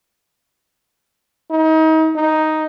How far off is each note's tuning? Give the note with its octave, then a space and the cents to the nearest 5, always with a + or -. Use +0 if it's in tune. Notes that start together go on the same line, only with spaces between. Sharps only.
D#4 +35
D#4 +5